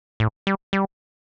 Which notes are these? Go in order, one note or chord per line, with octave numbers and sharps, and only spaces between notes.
A2
G3
G3